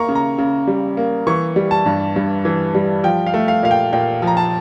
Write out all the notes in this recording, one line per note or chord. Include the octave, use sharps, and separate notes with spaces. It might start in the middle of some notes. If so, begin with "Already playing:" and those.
Already playing: A#3 A#5 C#6
C#3
A#5
C#3
G3
A#3
E3 C#6
G3
A5
G2
G2
E3
G3
F3 G5
F5
A3
F5
A#2 F5
G5
A#2 G5
F3
A#5
A5